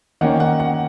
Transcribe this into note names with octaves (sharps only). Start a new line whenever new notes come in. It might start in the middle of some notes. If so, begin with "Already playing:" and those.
D#3 A#3 C#4 F#5
F#5
F#5